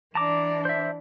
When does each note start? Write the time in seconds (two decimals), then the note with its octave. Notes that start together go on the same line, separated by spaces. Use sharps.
0.15 E3 D4 A5 A#5 D6
0.65 C5 E5